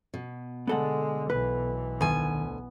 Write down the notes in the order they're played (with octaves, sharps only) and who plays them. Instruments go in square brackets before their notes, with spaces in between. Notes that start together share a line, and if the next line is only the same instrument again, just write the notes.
[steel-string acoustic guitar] B2
[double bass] D3 G#3 [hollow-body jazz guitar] B3 A4 F#5
[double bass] B1 E3 [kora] B4
[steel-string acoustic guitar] D2 G#5 [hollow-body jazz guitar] D#3 [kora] B3